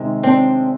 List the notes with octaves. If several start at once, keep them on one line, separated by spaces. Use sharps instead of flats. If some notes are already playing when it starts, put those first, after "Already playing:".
Already playing: C3 D#3 G#3
C4 D4